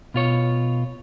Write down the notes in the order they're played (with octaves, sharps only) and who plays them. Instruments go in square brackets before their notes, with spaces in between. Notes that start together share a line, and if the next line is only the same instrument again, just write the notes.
[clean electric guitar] B2 F4 C#5